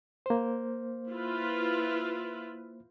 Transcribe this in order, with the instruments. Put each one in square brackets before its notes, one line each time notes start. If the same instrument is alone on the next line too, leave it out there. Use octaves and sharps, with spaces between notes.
[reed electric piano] A#3 C5
[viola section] E4 F4 B4